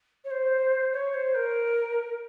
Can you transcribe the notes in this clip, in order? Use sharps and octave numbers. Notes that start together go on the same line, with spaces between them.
C#5
C5
C#5
C5
A#4